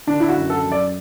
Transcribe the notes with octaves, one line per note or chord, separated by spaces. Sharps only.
D3 D4
E4
F#4
F#2
A4
F#3
D5